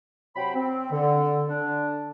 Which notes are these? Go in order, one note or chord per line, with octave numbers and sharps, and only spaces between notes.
C3 F#3 C5 G5 B5
C4
D3
D3 D4